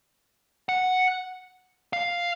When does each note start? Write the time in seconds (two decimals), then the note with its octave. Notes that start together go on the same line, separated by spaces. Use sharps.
0.69 F#5
1.93 F5